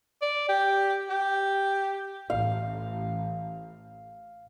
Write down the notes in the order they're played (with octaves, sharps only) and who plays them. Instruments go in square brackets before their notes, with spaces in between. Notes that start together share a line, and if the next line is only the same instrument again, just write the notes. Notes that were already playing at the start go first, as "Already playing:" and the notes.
[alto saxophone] D5
G4
G4
[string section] A1 [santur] F5